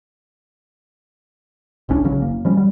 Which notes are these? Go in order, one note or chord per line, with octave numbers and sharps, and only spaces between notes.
G#1 C#2 C#4 D4
A#1 C#3 F#3 C#4
F#1 A#3
F3 G3 C#4
F#3 G3